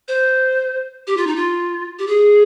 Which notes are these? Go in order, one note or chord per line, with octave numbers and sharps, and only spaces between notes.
C5
G4
F4
D#4
F4
G4
G#4